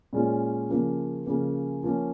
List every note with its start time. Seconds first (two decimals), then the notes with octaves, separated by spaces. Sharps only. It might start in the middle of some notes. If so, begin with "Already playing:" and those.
0.13 A#2 G#3 C#4 F4
0.69 C#3 F3 A#3 C#4
1.27 C#3 F3 A#3 C#4
1.83 F3 A#3 C#4